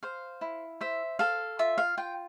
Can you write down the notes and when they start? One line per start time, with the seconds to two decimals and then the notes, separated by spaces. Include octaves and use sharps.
0.03 C5 F5
0.41 E4
0.81 C5 E5
1.19 A4 F5
1.59 F4 E5
1.78 F5
1.98 F4 G5